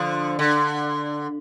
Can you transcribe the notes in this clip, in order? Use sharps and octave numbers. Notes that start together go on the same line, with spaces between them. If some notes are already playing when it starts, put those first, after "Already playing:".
Already playing: D3 F3
D3